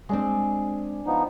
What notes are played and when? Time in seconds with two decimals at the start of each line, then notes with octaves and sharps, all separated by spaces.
0.09 G#3 C4 D4 G#4
1.06 F3 B3 D#4